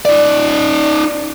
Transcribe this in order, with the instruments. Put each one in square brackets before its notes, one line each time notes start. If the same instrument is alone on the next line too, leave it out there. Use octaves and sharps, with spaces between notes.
[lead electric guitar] D#4 D5